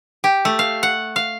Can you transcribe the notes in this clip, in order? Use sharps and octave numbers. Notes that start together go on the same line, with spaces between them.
G4
A3
F5
F#5
F5